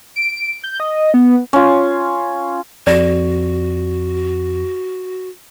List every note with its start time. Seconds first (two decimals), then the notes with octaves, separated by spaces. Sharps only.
0.16 D7
0.64 G6
0.80 D#5
1.14 B3
1.53 C#4 F4
2.87 F2 F#4 D5